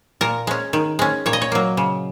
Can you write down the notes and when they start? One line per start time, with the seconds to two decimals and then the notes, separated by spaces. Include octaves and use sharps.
0.21 A#2 A#4
0.47 G#3 C#4
0.73 D#3
0.99 G#3 C#4
1.26 A#2 C#5
1.33 D#5
1.42 C#5
1.52 F#3 A#3
1.77 C#3